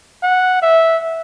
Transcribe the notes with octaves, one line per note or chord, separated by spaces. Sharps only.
F#5
E5